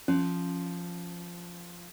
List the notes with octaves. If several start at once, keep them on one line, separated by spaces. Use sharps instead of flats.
F3 C#4